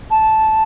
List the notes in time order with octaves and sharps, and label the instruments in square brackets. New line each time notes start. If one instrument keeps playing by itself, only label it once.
[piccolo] A5